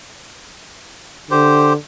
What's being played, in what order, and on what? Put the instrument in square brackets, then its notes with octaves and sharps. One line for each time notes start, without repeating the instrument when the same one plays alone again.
[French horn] D3 [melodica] G4 C5